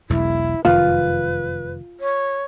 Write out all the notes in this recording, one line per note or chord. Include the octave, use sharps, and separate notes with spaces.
E1 B1 E2 E4
F1 F#2 D#3 F4 B4
C#5